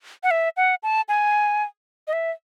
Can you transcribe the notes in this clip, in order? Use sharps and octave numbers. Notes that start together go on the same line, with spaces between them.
F#5
E5
F#5
A5
G#5
D#5
E5